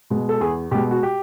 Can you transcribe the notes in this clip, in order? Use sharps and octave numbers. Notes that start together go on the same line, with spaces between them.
B2 G#3
A4
E2 G#4
B2 G#3 G4
F#4
G4